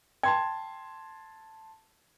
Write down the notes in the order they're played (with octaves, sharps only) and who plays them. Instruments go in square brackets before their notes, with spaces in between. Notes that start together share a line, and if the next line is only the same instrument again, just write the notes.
[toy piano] G5 [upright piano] A5 C6 G#6